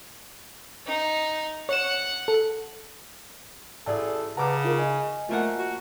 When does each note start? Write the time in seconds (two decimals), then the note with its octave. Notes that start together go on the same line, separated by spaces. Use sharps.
0.86 D#4
1.69 C#5 F#5 E7
2.28 A4
3.86 A1 G#4 A4 D5 A5
4.37 C#3 B4 F#5 A5 A#5 D6
4.64 D#4 F4 A#4
4.79 D#5 G#5
5.29 F3 A3 A#3 F#5
5.58 F#4